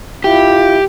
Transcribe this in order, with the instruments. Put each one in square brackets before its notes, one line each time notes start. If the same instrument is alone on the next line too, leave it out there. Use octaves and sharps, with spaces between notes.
[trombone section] E4 F4 [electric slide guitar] G4